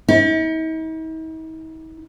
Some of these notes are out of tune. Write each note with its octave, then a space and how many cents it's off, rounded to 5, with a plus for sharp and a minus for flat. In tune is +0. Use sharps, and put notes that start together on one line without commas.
D#4 +45